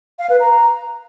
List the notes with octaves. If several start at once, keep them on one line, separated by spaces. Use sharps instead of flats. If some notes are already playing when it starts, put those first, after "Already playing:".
F5
B4
A#5